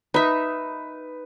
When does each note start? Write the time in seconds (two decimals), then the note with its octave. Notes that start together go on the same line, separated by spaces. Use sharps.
0.14 D#4 B4 E5